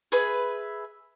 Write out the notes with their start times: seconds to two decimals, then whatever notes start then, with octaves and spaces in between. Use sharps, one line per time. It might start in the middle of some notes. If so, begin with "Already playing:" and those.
0.12 G#4 B4 E5